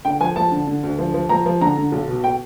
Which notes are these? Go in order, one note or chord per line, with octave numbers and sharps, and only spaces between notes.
D3 G5
F3 G#5
F3 A5
D3
D3
D2
F3
F3
F3 A#5
F3
D3 A#5
D3
B1
B2
G5